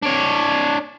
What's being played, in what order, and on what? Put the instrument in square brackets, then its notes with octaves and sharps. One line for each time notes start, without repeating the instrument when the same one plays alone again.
[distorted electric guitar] D4 C#5